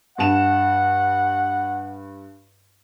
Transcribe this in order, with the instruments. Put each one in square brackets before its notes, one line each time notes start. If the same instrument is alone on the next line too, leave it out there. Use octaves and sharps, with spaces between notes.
[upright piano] G2 A5 E7 [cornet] F#5